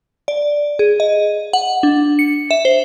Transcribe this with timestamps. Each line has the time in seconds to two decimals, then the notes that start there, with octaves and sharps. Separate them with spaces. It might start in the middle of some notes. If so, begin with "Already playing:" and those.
0.28 D5
0.79 G#4
1.00 D#5
1.53 F#5
1.83 D4
2.19 C#7
2.51 E5
2.65 C5